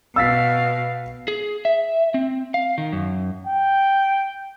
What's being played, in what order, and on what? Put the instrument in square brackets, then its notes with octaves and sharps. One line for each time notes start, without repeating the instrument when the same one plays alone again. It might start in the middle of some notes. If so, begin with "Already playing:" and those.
[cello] B2 [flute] F5 [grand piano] E6 A6 B6
[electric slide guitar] G#4
E5
C4
F5
D#3
F#2
[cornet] G5